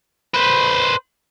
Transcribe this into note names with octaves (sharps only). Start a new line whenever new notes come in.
B4 C5